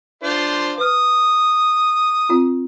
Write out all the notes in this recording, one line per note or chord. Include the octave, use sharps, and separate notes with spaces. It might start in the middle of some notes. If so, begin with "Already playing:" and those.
D4 F4 C5
B4 D#6 F6
C4 F4